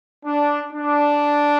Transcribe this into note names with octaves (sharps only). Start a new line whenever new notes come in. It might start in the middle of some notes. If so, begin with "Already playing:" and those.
D4
D4